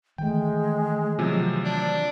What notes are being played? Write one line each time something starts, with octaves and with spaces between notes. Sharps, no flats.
D#3 E3 G#3 A3 G5
C3 F3 F#3
D4